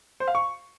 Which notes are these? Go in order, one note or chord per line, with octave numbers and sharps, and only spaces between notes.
C5
F5
C#6